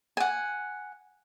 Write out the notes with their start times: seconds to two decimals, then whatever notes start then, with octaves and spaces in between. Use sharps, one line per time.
0.17 F#5 G#5